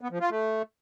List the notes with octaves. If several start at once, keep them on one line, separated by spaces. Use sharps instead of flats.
B3
F3
F4
A3